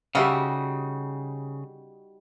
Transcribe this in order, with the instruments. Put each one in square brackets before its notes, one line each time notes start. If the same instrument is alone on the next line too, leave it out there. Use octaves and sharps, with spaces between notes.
[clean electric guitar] C#3 [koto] G3 D#4 F#4 [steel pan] G4 E5 F5